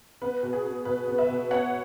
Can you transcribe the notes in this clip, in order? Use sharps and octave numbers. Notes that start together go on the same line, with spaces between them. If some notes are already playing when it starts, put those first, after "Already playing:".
B3 B4
B2
G#4
B3
B2 B4
B3
B4 E5
B2
B3 C#5 F#5